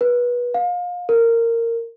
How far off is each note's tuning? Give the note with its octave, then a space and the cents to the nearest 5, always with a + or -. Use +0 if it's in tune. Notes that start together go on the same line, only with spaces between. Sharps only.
B4 -25
F5 +30
A#4 -15